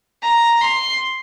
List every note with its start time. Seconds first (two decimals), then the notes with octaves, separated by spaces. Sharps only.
0.22 A#5
0.61 C6